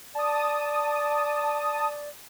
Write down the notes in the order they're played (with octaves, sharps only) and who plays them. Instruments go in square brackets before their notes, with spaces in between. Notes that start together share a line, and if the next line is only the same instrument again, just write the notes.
[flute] D5 [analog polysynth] A5 D#6